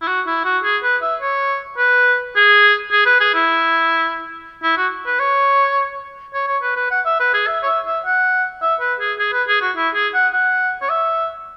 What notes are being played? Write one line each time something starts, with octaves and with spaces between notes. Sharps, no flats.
E4
F#4
E4
F#4
G#4
B4
E5
C#5
B4
G#4
G#4
B4
G#4
E4
E4
F#4
B4
C#5
C#5
C#5
B4
B4
F#5
E5
B4
G#4
E5
C#5
E5
E5
F#5
E5
B4
G#4
G#4
B4
G#4
F#4
E4
G#4
F#5
F#5
C#5
E5